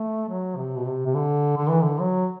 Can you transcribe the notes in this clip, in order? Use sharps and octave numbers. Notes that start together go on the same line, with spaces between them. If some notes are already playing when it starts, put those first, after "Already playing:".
Already playing: A3
F#3
C3
B2
C3
C3
D3
D3
E3
D3
F#3